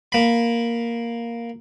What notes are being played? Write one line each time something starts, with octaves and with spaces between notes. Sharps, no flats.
A#3 B5